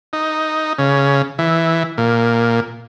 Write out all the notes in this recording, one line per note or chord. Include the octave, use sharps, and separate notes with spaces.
D#4
C#3
E3
A#2